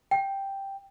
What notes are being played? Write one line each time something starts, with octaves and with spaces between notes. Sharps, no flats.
G5